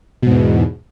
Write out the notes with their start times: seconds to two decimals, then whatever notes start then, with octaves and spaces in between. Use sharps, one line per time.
0.22 B2
0.27 G#2
0.31 E2